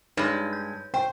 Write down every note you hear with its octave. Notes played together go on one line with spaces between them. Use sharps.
G2 G#3 D#4 B4 C#5
G6
C5 G5